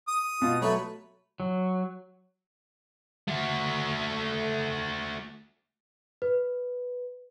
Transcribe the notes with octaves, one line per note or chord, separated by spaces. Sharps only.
D#6
B2 F4
F#3 A3 B4 C#5
F#3
A3 F#4
B4